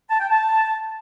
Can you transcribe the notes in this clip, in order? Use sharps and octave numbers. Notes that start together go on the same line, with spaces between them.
A5
G5
A5